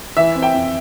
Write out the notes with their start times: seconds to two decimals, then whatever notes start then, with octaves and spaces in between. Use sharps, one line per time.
0.17 E3 E5
0.35 C4
0.42 G5
0.54 F2